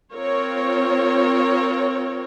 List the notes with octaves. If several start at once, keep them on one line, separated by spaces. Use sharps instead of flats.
C4 F4 A#4 C#5